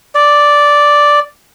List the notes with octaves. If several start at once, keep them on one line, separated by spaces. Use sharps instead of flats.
D5